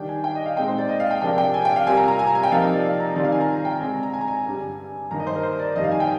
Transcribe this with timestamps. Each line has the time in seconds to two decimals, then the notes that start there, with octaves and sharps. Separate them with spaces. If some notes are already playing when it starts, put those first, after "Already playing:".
Already playing: D#3 G3 D4 G5
0.09 G#5
0.24 G5
0.35 D#5
0.46 F5
0.57 A#2 G#3 C4 D#4 G5
0.68 C5
0.78 D5
0.89 D#5
1.00 F5
1.11 G5
1.22 C3 F3 A#3 D4 G5
1.38 G5
1.54 G#5
1.65 G5
1.76 F5
1.86 C3 G3 A#3 F4 G#5
1.97 A#5
2.08 A#5
2.19 G#5
2.27 A#5
2.35 G#5
2.43 G5
2.51 C3 F3 A#3 D#4 F5
2.73 D5
2.84 F5
3.00 A#5
3.16 D#3 G3 C4 F4 D5
3.25 F5
3.32 G#5
3.41 A#5
3.65 G5
3.81 D3 G#3 C4 G#5
3.92 A#5
4.03 A#5
4.14 G#5
4.21 A#5
4.28 G#5
4.46 G2 D3 G3
5.11 G2 D#3 A#3 D#4 A#5
5.20 D#5
5.27 C5
5.36 A#4
5.43 C5
5.60 D5
5.76 F2 D#3 G3 A#3 D#5
5.84 F5
5.91 G#5
6.00 G5